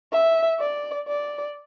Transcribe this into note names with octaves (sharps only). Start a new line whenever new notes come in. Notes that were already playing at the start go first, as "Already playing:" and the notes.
E5
D5
D5